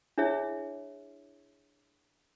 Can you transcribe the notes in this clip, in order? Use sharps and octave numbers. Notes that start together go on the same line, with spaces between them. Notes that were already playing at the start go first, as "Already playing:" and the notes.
D4 E4 G#4 C#5 E5